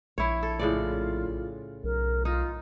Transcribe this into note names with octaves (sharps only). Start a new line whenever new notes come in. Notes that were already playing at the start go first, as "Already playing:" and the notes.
A#1 E4 C#5
A4
A2 C#3 F4 D5
B1 A#4
D#4 F4